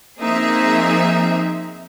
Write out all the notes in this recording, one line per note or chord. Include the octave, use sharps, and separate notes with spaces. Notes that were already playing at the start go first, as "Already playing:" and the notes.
F3 A#3 C4 D#4 G#4 E5